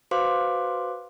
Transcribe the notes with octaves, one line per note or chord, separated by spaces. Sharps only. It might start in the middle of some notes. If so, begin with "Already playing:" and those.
F#4 B4 C5 F5 C6 D6